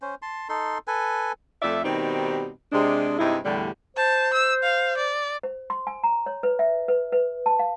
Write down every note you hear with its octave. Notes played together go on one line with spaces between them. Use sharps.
C#4 C5
A5 C6
D#4 A4 C6
A4 B4 G#5
F2 A3 D5 E5
B2 D#3 G3 C4 D#4 G4
C3 G#3 D4
G2 C3 G#3 D#4 E4
E2 A2 D3 G3
C5 A5
E6
F5
D5
C5
C6
G#5
A#5
C#5
B4
E5
B4
B4
A5
F5